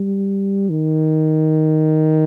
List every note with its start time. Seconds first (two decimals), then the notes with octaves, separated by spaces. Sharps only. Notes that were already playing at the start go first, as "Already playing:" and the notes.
Already playing: G3
0.70 D#3